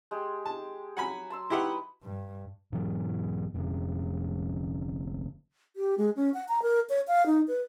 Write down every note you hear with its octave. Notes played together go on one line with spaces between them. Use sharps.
G#3 G4
A5
F#3 F#5 G#5 B5
A5 C6 E6
E4 G4 B4 D#5 F#5 B5
G2
G#2 E3 F#3
F1 F2 A#2 D3
G4
G#3
C#4
F#5
A#5
A#4
C#5
F5
D#4
B4